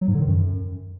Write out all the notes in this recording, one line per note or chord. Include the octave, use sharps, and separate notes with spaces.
F#3
G#2
D3
D#3
F#2